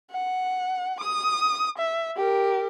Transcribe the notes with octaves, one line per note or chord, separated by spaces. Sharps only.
F#5
D#6
E5
G4 A#4